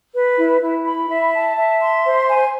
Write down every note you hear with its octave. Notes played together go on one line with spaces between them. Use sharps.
B4
E4
E4
B5
E5
A5
E5
C6
C5
G#5